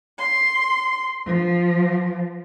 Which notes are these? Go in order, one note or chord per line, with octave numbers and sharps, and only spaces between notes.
C6
F3